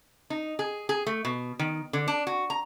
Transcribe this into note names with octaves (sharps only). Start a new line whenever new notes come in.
D#4
G#4
G#4
A3
B2
D#3
D3
D4
F#4
A#5